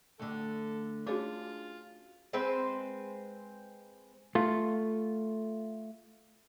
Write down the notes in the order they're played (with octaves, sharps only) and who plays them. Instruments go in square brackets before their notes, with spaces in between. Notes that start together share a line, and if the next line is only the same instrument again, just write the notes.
[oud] D2 D3 [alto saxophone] A4
[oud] C#4 D4 [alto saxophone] F4 [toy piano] F#4 G#4 D6
[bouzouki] G#3 C4 B4 C5
[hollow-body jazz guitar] A3 F4